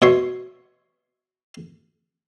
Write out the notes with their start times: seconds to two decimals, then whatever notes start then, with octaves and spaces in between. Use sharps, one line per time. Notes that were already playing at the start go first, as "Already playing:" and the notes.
0.02 B2 C#5 E5 C6